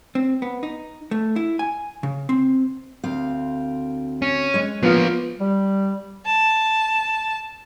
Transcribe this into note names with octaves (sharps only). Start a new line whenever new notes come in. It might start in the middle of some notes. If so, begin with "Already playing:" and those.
C4
B3
D#4
A3
E4
G#5
C#3
C4
D2 C4 F5
C#4
G#3 C#5
F3 A#3 B3 F4
G3
A5